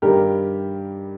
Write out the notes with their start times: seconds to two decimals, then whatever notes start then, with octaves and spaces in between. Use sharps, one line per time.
0.02 G2 D#3 G3 G4 A#4